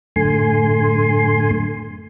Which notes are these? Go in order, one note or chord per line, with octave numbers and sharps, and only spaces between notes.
F#2 A2 D3 A3 G#5 C6